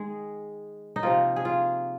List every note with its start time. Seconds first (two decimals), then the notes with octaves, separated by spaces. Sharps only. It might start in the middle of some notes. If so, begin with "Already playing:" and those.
Already playing: D#3 G#3 G#4
0.96 D#4
1.03 C3 F3 A#3 F4
1.36 G#4
1.45 F4